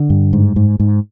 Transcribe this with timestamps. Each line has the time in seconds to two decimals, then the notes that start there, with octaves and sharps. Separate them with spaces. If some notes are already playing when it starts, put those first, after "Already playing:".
Already playing: D3
0.10 G2
0.33 G#2
0.56 G#2
0.80 G#2